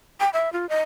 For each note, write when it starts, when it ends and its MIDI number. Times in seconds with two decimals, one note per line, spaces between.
0.20 0.29 79
0.33 0.52 76
0.53 0.69 65
0.69 0.81 75